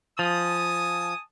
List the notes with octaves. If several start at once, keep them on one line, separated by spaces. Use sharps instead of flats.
F3 G#5 A5 D#6